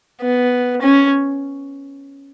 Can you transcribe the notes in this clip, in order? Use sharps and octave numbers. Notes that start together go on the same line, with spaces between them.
B3
C#4